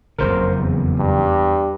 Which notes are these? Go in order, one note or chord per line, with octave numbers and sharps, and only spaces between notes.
F#1 F2 C#3 A#4 C5
E2
G2